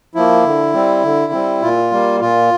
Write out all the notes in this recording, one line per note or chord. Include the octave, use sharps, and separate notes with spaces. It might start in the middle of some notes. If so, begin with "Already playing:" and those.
F3 A#3 E4
D3
G3 C4
D3
G3 C4
A#2 F4
G3 A#3
A#2 F4